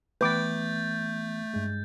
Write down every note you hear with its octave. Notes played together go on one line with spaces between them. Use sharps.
E3 A3 B3 B4 D6 G6 A6
G2 G#3